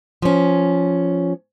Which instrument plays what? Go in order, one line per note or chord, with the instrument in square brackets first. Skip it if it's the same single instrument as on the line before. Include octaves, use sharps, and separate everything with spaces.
[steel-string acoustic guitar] F3 C#4